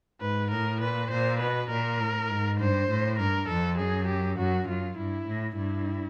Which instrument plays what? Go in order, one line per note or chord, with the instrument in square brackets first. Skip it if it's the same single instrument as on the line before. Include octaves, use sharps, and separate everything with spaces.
[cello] G#2 [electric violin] B4
[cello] A2 [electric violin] A#4
[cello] A#2 [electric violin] B4
[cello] A#2 [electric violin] C5
[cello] B2 [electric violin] B4
[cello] A#2 [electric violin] A#4
[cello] A2
G#2
[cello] G2 [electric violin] C5
[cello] A2
[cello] G2 [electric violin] A#4
[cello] F2 [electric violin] A4
[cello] F#2 [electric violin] G#4
[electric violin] G4
[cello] F#2 [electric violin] F#4
[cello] F#2 [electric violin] F4
[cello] G2 [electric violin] E4
[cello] A2
[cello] G2 [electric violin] E4